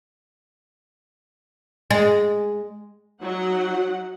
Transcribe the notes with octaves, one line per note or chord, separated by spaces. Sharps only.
G#3
F#3 D#4 F#5